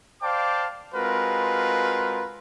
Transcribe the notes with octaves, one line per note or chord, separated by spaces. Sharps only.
C5 D5 F5 G5 A5 D6
G#3 C4 F4 F#4 A#4 B4